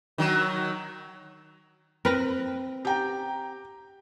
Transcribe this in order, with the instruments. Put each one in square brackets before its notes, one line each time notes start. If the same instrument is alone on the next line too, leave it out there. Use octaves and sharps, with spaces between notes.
[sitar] D#3 F#3
[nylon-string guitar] C4 [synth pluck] A#4 B4 A#6
[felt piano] G4 G5 A#5